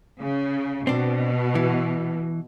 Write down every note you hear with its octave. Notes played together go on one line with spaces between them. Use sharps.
C#3
B2 C4 D4
E3